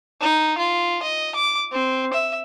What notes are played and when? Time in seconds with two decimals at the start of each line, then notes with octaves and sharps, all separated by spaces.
0.21 D#4
0.58 F4
1.03 D#5
1.35 D6
1.72 C4
2.13 E5